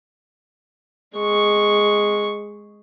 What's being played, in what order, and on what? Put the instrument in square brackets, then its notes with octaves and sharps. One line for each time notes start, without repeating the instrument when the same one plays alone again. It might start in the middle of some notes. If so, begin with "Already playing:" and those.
[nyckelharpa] G#3 C#6